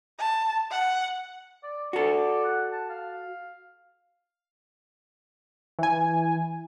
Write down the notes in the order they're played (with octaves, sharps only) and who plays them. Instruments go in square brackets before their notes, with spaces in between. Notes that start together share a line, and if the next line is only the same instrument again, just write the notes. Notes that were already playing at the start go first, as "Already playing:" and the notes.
[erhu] A5
F#5
[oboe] D5
[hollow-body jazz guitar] F#4 A4 [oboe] D5
[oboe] F#5
A5
F5
[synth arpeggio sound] E3 G#5